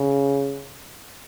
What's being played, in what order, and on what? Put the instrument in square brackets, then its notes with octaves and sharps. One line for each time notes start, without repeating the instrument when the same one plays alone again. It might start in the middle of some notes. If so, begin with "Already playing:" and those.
Already playing: [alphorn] C#3